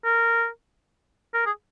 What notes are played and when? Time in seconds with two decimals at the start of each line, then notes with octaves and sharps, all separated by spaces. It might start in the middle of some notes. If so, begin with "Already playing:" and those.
0.05 A#4
1.34 A#4
1.46 G#4